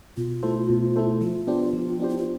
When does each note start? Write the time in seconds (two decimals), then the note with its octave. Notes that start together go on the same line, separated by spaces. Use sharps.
0.17 B2 F4
0.43 A3 E4 A4 C5
0.70 B2
0.96 A3 E4 A4 C5
1.21 F3 F4
1.47 B3 D4 G4 C5
1.73 F3
2.00 B3 D4 G4 C5
2.10 E4
2.17 F4